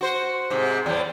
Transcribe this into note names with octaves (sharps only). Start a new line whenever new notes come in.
F#4 C5
G#2 C3
E2 A2 G3